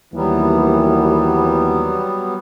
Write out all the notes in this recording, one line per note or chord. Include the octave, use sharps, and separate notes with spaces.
D#2 E3 F#3 G3 B3